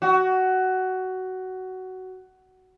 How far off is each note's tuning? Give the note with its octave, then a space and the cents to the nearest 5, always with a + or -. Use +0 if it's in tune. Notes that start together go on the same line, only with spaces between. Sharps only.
F#4 +15